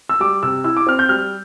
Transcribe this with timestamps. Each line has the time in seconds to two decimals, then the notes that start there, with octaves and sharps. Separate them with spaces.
0.09 E6
0.20 G3 D6
0.43 C3 E6
0.64 E4 E6
0.77 D6
0.87 C4 F6
0.99 G6
1.09 G3 F6